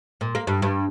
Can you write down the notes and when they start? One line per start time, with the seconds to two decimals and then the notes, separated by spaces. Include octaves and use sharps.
0.21 A#2
0.35 A#3
0.47 G2
0.62 G2